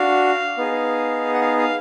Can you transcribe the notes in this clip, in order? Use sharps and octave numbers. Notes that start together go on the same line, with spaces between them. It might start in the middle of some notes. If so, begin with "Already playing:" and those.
Already playing: D4 F#4 F5
B3 D#4 G#4
F#5
F5
F5